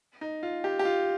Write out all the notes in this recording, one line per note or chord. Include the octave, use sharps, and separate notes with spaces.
D#4
F4
G4
G4
F4